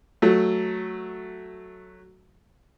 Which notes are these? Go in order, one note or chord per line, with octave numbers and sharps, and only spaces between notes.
F#3 A3